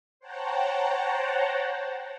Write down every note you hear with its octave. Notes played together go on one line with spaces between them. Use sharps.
C5 C#5 F#5 G5 A5 A#5